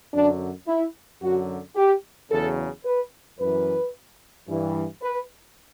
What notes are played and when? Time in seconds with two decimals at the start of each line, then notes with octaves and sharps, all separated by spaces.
0.13 F#2 D3 F#3 D4
0.68 E4
1.21 F#2 D3 F#3 F#4
1.76 G4
2.31 E2 C#3 F#3 A4
2.85 B4
3.39 F#2 E3 B4
4.48 G2 E3
5.03 B4